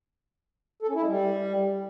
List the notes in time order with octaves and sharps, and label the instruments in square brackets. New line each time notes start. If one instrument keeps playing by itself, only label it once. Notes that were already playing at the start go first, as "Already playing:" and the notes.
[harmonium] A4
C#4
E4
G#3
G3